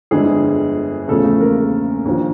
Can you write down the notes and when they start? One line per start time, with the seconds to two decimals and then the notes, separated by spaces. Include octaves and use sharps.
0.11 G1 F2 D3 G#3 G#4
1.08 E2 C#3 F3 A3 A4
1.25 A3 A4
1.41 A#3 A#4
2.05 D#2 D3 F3